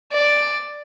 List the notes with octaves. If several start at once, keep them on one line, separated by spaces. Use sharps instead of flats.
D5